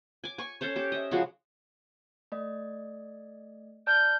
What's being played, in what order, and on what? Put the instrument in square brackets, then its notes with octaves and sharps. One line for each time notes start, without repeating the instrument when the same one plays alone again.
[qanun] G#5 D6
G#5 C#6
C#4 A4 C5 C#5
G4 A4
D#5 E5
C#3 F3 G#3 F#4
[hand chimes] A3 D5 D#5
[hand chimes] D5 A5 F6 [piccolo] G6